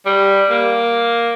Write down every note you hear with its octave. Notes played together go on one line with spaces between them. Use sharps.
G3
A#3